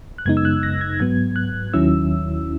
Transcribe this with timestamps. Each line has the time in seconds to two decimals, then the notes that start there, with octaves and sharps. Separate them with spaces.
0.18 F#6
0.26 F#2 C#3 G#3 B3 D#4 G#6
0.37 E6
0.45 F#6
0.63 A#6
0.81 G#6
1.00 G#2 F#3 B3 G#6
1.36 F#6
1.73 D#2 D#3 F#3 C#4 E4 E6